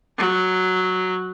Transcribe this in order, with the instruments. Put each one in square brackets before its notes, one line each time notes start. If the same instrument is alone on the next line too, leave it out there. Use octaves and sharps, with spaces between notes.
[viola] F#3